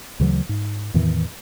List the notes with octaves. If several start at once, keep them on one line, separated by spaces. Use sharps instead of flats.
D2 C#3 E3 F#3
G#2
E2 A2 D#3 E3